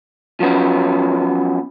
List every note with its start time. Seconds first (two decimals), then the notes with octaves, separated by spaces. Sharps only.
0.40 F3 F#3 B3 C#4